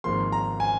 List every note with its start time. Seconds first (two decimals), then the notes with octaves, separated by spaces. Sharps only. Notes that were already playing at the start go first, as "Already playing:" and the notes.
0.04 G#1 G#2 F3 A#3 C6
0.32 A#5
0.60 G#5